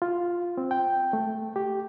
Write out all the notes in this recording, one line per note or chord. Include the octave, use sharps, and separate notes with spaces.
F4
C4
G5
A3
G4